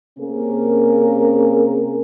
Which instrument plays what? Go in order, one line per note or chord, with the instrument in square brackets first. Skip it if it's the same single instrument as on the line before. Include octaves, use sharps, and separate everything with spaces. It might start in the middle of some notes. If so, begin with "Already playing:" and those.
[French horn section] C3 A#3 C#4 G#4 A#4